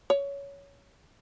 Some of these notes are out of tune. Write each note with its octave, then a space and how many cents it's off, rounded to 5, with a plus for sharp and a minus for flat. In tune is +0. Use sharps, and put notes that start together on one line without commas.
C#5 +15